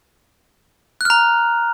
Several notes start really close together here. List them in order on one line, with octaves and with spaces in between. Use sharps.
F#6 F6 A#5